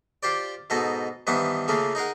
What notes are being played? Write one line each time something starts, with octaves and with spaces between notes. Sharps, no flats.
F4 G4 C5 D5
G#2 B2 D#4 A4 D#5
G2 D#3 E3 B3 C5 F#5
C#3 A3 A#3 F4 G#4
D#4 G#4 A#4 F#5